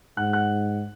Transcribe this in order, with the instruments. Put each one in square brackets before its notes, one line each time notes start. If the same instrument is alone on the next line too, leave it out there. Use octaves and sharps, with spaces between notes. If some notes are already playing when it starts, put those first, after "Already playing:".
[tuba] G#2 [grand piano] F#5 F#6
[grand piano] F#5 F#6